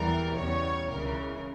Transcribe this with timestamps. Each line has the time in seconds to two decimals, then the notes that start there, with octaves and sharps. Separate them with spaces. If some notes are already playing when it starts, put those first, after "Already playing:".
Already playing: E2 E3 G3 A#4
0.36 E2 C#3 G3 C#5
0.91 C#2 C#3 E3 A#4